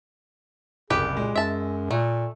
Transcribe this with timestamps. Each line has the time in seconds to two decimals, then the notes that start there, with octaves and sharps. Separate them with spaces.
0.90 F#1 C2 G4 G#4 B4
1.17 A#2 G#3
1.36 F#2 E5 A5
1.91 A#2 A3